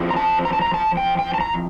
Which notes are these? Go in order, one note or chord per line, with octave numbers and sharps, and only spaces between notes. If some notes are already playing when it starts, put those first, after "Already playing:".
Already playing: F3 C4 E4
A#5
A5
A#5
A5
A#5
A5
G5
G5
A5
A#5